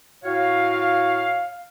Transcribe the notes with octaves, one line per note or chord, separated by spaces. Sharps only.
A2 F#4 C#5 F5